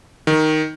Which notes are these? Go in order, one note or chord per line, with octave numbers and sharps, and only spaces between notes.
D#3